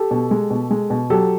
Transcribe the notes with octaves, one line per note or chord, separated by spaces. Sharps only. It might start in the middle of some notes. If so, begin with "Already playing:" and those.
Already playing: G4 A4
B2
G#3
B2
G#3
B2
F#3 G4 A4